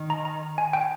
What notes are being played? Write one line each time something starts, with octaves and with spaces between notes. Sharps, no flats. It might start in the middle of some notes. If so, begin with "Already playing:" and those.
Already playing: D#3
A#5
A#5
G#5
G5